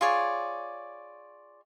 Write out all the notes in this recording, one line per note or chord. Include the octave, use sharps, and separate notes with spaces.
F4 G#4 C#5 D5